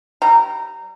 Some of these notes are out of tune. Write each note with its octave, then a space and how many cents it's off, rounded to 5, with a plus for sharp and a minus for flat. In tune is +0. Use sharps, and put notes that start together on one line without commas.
G3 -30 A#5 -15